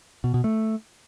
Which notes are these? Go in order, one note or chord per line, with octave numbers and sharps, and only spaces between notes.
B2
B2
A3